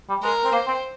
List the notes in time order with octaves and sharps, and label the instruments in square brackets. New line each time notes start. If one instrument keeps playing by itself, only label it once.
[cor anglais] G3
[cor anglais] G#3 [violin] A#4
[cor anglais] C4
[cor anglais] A#3 [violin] C5
[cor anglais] C4